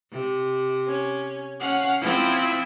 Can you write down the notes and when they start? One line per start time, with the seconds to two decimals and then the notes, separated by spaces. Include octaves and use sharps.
0.11 C3
0.87 C#4
1.60 C#4 F5 F#5
2.01 F3 C4 E4 E5